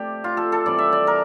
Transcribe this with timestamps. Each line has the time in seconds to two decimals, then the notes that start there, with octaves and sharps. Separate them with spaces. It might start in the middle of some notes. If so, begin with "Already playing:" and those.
Already playing: C3 A3 G4 D5
0.24 F4
0.37 A4
0.52 A4
0.66 C3 E3 G3 D5
0.78 E5
0.92 D5
1.07 A#4